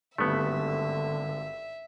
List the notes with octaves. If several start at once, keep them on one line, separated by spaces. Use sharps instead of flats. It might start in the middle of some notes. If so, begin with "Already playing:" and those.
G#1 G2 D3 A3 B3 E5